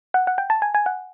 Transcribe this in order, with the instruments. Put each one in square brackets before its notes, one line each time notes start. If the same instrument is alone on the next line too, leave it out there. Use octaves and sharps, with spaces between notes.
[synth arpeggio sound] F#5
F#5
G5
A5
G#5
G#5
F#5